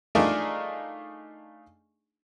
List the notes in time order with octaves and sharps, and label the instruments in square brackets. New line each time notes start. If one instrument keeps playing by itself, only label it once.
[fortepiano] A3 D4 D#4 F4 G#4 A#4